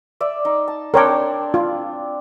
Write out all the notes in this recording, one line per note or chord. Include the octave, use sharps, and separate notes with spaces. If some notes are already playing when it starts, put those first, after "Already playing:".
D5 E5
D#4
A5
C4 D4 A#4 C#5 G5
F4